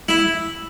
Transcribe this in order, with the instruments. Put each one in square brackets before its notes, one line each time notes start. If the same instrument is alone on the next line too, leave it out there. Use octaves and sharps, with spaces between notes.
[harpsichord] E4